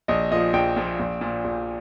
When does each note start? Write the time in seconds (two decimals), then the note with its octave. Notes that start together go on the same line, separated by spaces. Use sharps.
0.08 A#1 D#5
0.31 A#2 F3 D#5
0.53 A#1 G5
0.76 A#2 F3
0.99 A#1
1.21 A#2 F3
1.44 A#1